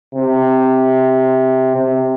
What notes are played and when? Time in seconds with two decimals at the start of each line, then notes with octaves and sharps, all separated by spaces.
0.15 C3
1.76 C3